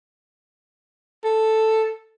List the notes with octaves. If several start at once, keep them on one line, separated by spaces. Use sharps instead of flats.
A4